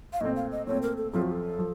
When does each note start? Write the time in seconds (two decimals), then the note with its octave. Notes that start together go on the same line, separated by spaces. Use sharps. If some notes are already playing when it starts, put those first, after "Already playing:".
0.13 F5
0.21 A#2 A3 C4 D#5
0.36 F5
0.52 D#5
0.67 A#2 A3 C4 C#5
0.82 A#4
0.97 A4
1.12 F#2 F3 C4 F4 A4
1.22 F#4
1.32 A4
1.59 F3